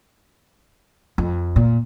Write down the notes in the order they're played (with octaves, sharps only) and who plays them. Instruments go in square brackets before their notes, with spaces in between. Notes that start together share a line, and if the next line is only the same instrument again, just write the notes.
[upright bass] F2
A#2